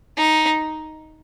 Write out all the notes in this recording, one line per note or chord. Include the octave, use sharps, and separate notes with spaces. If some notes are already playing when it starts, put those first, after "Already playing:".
D#4